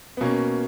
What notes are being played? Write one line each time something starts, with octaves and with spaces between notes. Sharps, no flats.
B3
B2 A#3 C#4